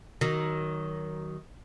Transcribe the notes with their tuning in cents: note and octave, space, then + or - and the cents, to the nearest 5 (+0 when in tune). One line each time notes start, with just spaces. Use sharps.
D#3 +0 F#3 +20